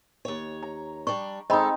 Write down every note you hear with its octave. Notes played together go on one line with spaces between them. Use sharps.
D#2 C#5
A#5
G3 D4 C#6
G#3 C4 D#4 A4 D#5 B5